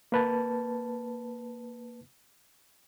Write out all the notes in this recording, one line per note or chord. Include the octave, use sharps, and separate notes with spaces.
A#3 B4 A5